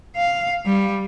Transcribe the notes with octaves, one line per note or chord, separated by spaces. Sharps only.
F5
G3